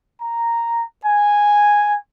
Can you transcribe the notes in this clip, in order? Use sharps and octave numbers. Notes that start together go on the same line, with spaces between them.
A#5
G#5